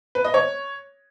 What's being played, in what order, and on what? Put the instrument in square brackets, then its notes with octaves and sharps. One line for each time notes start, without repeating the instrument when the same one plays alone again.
[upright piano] B4
D#5
C#5